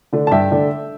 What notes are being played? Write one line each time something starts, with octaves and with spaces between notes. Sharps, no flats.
D3 A3 D4
A5
G2 E5 G5
D3 A3 D4